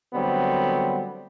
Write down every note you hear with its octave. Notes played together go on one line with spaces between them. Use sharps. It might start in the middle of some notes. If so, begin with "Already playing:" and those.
D3 F#3 G3 A3 B3 C4